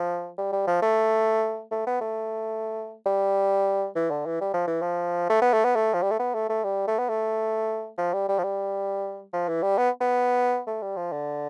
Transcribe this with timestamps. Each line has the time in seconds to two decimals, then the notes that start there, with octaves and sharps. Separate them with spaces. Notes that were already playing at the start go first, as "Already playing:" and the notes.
Already playing: F3
0.38 G3
0.52 G3
0.67 F3
0.82 A3
1.71 A3
1.87 B3
2.01 A3
3.06 G3
3.95 E3
4.10 D3
4.26 E3
4.41 G3
4.54 F3
4.67 E3
4.82 F3
5.29 A3
5.42 B3
5.53 A3
5.64 B3
5.75 A3
5.94 F3
6.02 G3
6.11 A3
6.19 B3
6.34 A3
6.49 A3
6.64 G3
6.87 A3
6.99 B3
7.09 A3
7.98 F3
8.13 G3
8.28 G3
8.38 F3
8.43 G3
9.33 F3
9.48 E3
9.62 G3
9.78 B3
10.01 B3
10.67 A3
10.82 G3
10.97 F3
11.12 D3